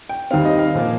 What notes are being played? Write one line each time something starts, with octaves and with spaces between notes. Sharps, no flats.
G5
D#2 D#3 G3 C4 F5
D#5
F5
A#2 F3 A#3